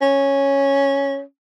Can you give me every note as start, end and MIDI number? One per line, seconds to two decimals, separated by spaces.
0.02 1.20 61